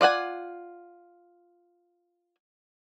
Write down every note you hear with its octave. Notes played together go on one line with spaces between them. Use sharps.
F4 D5 F#5 G#5